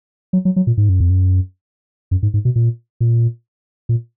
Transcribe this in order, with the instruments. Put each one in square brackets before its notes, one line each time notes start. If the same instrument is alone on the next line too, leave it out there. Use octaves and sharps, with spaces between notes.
[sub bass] F#3
F#3
F#3
A#2
G#2
F#2
F2
F#2
F#2
G#2
G#2
B2
A#2
A#2
A#2